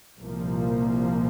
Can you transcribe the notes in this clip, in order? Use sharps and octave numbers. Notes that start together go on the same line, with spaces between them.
C2 A#2 F3 A#3